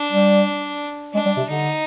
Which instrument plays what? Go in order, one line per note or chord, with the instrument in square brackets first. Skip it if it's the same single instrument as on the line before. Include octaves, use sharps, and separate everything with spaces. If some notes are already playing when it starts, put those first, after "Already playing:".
Already playing: [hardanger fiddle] D4
[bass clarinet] G3
[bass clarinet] G#3 [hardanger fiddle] D4
[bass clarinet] G3
C3
[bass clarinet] D3 [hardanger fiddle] D#4